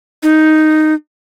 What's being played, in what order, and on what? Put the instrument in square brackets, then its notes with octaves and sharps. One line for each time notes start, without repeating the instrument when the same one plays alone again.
[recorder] D#4